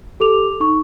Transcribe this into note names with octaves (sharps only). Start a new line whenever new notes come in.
G4 A4 D6 F7
D#4 C#6